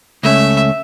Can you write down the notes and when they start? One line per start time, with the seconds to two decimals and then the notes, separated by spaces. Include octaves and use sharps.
0.23 C#2 A3 C#4 E5